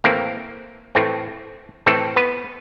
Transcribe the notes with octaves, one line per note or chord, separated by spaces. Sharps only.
A2 E3 A3 A#3 C4 A#4
A2 E3 A3 C4
A2 E3 A3 C4 A4
B3 B4